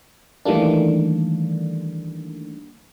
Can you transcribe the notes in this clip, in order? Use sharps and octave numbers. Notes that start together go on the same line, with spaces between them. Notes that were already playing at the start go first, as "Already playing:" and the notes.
D#3 E3 G3 A3 A#3 D4